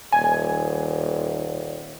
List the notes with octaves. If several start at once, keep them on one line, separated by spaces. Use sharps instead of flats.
D#1 G#5